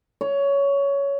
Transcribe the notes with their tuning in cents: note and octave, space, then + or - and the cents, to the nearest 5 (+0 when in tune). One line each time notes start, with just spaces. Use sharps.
C#5 +15